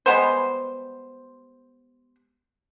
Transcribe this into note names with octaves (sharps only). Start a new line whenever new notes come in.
G3 G#3 B3 C5